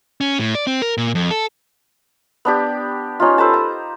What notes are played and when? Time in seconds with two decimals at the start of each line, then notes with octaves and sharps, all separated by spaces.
0.21 C#4
0.39 A2
0.55 D5
0.67 C4
0.82 A#4
0.98 A#2
1.15 F2
1.31 A4
2.45 B3 D4 G4
3.20 C#4 D#4 F4
3.38 A4 B4 C5 A5
3.54 A#5